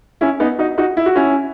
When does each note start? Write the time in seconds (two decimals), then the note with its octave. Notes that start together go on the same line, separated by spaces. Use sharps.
0.21 C#4 E4
0.40 B3 D#4
0.58 D#4 F#4
0.78 D#4 F#4
0.97 E4
1.06 F#4
1.15 C#4 E4